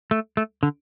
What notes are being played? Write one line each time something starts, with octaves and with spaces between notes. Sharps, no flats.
A3
A3
D3